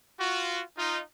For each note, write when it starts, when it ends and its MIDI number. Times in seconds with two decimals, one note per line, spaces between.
0.20 0.62 65
0.20 0.62 66
0.78 1.00 63
0.78 1.00 65